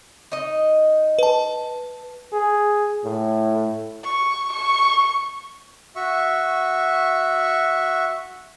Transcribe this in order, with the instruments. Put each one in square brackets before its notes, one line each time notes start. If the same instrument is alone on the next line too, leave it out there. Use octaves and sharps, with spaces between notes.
[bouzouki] D#4 D#5
[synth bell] B4 A5
[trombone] G#4
A2
[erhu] C#6
C#6
[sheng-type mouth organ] F#4 E5 C#6